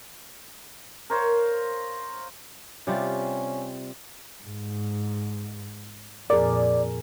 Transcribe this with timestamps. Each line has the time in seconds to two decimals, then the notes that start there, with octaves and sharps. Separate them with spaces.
1.10 A#4 C5 C#5 F5
2.87 C3 G3 C#4 F4
4.42 G#2
6.30 F2 A#2 G#4 A#4 D5